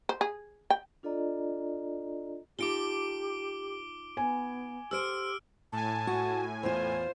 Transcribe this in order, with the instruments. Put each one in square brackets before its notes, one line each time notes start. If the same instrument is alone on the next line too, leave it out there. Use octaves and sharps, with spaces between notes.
[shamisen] C5
G#4
G5
[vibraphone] D4 F4 A4 D5 D#5 A#5
[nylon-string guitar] D#4 F4 A4 [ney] G4 [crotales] D6 D7 G7
[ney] B3 [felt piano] G#5
[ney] G4 [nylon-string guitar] A4 C5 [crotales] E6 F6 D7
[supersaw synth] A2 G#5 [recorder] A5
[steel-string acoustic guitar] F#4
[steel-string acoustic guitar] E2 F4 [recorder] C5